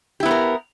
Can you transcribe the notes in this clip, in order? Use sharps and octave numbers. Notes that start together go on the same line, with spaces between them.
B3 E4 G4 A#4 B4